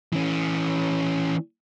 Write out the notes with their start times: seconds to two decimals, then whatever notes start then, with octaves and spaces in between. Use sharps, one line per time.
0.13 E3 C#4